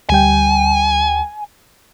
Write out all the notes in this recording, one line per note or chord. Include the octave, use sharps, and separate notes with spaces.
D2 G3 G5 G#5